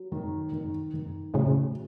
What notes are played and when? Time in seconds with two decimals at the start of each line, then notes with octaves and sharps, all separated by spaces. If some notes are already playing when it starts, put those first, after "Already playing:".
Already playing: F#3
0.12 D#3
0.52 D#3
0.94 D#3
1.34 A2 C#3 F#3